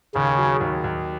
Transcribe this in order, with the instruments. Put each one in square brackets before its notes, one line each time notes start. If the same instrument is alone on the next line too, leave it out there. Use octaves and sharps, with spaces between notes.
[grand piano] D#2 [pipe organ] C#3
[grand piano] F#3
D#2
D#2